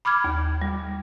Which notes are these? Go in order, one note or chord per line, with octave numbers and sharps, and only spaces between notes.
B5 D6 F6 G#6
D#2
G3